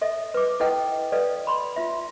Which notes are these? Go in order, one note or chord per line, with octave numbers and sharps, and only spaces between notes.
A4 D#5 E5
B4 D6
E4 A4 B4 D#5 F#5 G5
A4 B4 D5 D#5 F5
B5 C6
F4 E5